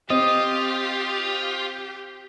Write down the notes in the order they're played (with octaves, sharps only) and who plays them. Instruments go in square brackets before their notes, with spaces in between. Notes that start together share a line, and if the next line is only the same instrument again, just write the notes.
[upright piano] C4 [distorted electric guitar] F4 [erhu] G4 [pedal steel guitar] D#5